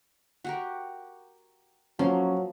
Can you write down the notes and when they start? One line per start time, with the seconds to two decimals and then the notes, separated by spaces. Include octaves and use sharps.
0.44 F#4 G4 A#4
1.99 F3 F#3 A#3 C#4 C6